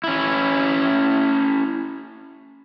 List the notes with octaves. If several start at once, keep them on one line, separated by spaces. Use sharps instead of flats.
C#4 E4